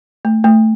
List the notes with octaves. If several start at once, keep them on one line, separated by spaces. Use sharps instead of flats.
A3
A3